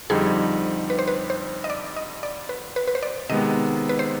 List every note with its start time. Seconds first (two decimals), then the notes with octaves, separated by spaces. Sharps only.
0.10 F2 D3 G3 C4 D#4 G#4
0.90 B4
0.99 C5
1.08 B4
1.30 C5
1.64 D#5
1.70 D5
1.96 D#5
2.23 D5
2.49 B4
2.76 B4
2.87 B4
2.95 C5
3.02 D5
3.29 C3 D#3 G#3 B3 D#5
3.89 B4
3.99 C5